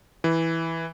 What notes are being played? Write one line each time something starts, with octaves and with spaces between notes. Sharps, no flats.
E3